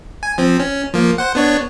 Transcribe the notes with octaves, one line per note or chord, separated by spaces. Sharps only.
G#5
F3 C4
C#4
F3 A#3
C5 F#5
B3 D4 C#5